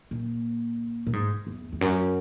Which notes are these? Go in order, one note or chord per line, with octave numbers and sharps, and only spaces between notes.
A#2
A#2
G#2
E2
E2
F#2